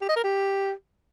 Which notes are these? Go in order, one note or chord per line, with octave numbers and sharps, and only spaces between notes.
G4
D#5
A#4
G4